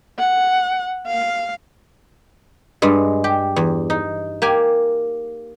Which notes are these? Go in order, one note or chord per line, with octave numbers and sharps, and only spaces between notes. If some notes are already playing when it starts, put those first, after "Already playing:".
F#5
F5
G2 G#3
G4
E2
D#4
A#3 G4 G#5